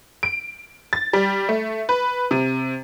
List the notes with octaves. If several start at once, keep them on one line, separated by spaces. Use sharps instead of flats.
D7
A6
G3
A3
B4
C3